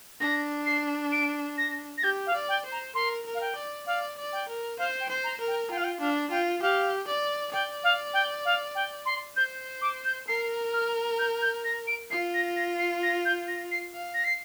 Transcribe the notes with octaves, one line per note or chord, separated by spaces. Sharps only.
D4 A#6
C7
D7
A#6
A#6
G4 G6
F5
D5
G5
C5
A#5
A#4 C6
A#4
F5
G5
D5
D5 F5
D5
G5
A#4
C5 F5
G5
C5
A#5
A#4
G5
F4 G5
F5
G5
D4 F5
F4 G5
G4 F5
D5
D5 G5
F5
G5
F5
G5
C6
C5 G6
D6
G6
A#4 C7
F6
G6
G6
A#6
D7
F4 C7
A#6
A#6
C7
A#6
G6
A#6
C7
F5
A#6
C7